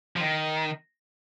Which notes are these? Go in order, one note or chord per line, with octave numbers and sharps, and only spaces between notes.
F3
D#3